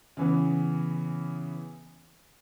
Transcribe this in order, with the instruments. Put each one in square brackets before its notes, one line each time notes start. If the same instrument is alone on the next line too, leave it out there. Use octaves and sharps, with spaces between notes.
[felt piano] C#3 E3 B3